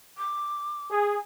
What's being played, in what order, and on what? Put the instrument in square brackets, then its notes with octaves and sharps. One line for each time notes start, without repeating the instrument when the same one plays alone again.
[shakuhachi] D6
[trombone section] G#4